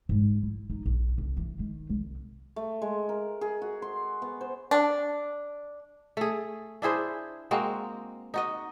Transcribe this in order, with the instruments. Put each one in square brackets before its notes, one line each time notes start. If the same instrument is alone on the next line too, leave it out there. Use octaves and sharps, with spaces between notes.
[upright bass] G#2
E4
D#4
A#1
C2
E3
D#3
C2
[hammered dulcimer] A3
G#3
A#4
G#4
F#4
C6
B3
C5
[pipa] D4
[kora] A3 G#4
D4 E4 G#4 C5
G#3 A#3 C4 F#4
D#4 F#4 D#5